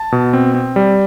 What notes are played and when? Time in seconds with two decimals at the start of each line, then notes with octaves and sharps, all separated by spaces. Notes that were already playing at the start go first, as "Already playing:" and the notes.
Already playing: A5
0.12 B2
0.33 C4
0.55 C4
0.76 G3